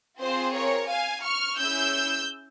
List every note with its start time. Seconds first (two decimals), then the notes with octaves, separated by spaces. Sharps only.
0.20 C4 F4 G#4 C5
0.55 A#4 C#5
0.90 F5 G#5
1.25 C#6 F6
1.60 C#4 E4 G#4 E6 G6